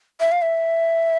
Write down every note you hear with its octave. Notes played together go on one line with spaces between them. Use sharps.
E5
F5
E5